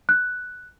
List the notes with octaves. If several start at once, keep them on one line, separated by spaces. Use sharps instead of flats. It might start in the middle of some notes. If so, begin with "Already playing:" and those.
F#6